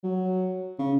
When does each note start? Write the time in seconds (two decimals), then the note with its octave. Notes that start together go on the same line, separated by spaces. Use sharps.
0.04 F#3
0.79 C#3